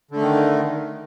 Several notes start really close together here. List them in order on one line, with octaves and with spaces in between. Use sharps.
D3 A3 D#3